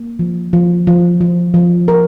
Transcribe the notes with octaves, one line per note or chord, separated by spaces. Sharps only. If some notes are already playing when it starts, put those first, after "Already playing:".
Already playing: A#3
F3
F3
F3
F3
F3
A#4